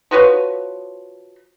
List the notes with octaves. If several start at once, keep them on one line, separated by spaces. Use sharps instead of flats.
F3 F#4 B4 C#5